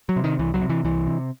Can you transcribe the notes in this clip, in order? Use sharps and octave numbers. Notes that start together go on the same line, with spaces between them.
F#3
C3
D#3
C2 E3
F#3
C3
E3
C2 E3
C3